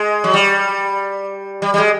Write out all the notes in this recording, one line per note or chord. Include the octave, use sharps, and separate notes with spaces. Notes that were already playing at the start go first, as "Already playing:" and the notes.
Already playing: G#3
F#3
G3
G3
G3
G#3